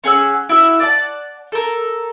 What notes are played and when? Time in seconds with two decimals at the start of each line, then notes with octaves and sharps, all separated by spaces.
0.04 C#4 G#4 F#5 E6
0.49 E4 F#4 E5
0.80 D5 F#5 A5
1.52 A4 A#4